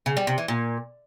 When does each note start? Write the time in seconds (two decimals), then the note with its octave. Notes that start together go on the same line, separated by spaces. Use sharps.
0.06 C#3
0.17 G3
0.27 C3
0.38 E3
0.48 A#2